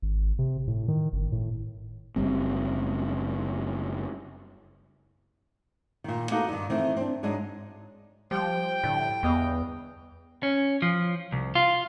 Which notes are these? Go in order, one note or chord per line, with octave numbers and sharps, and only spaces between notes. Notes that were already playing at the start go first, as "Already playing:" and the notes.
G#1
C3
A2
D#3
G1
A2
F#1 G3 C4
A#2 D#3
A#3 D#4 F#4 A4 B4
G2 D#3
D#3 E3 A3 C4
C4 D4
G#2 F#3 G#3 D4 D#4
F3 G3 G5
A2 D3
E2 B3 D#5 F5
C#4
F3
C2
F4